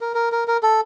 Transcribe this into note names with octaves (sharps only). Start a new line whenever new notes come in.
A#4
A#4
A#4
A#4
A4